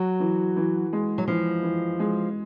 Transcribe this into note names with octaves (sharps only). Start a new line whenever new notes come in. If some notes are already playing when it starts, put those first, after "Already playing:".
Already playing: F#3 F#4
E3
E3
G#3
F#3
E3 F3
E3
G#3